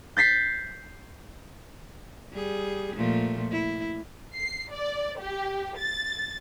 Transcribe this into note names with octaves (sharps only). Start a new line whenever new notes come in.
G6 A6 B6 C7
G3 G#4
A#2 F3 A3
E4
C7
D5
G4
A6